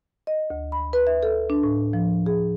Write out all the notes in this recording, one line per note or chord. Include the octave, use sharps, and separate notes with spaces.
D#5
D2
B5
B4
E5
A4
D4
A2
F3
G#4